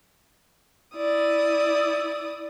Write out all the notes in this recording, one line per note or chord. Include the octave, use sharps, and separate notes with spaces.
E4 D5 D#6